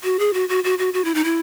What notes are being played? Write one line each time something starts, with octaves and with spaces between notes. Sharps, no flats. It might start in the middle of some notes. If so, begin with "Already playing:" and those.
F#4
G#4
F#4
F#4
F#4
F#4
F#4
E4
D#4
E4